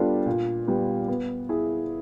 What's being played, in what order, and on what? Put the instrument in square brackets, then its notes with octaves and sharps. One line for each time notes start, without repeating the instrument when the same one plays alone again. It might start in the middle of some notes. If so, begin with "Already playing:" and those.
Already playing: [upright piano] G3 B3 D4 F4 A4
A#2
G3 B3
B3
E4 G#4